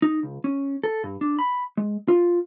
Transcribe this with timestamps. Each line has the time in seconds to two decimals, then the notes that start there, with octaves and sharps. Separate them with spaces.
0.02 D#4
0.23 C#2
0.44 C#4
0.83 A4
1.04 G2
1.21 D4
1.39 B5
1.77 G#3
2.08 F4